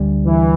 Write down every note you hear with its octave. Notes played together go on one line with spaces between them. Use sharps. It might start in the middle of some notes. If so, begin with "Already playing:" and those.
Already playing: D2 D3 G3
E3